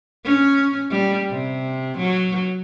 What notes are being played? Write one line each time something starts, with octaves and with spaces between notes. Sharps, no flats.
C#4
G3
C3
F#3